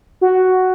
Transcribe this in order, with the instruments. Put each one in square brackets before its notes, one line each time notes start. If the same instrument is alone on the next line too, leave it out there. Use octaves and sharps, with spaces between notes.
[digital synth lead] F#4